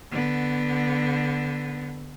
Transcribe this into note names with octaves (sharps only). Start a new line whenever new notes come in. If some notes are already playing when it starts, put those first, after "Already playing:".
D3 B3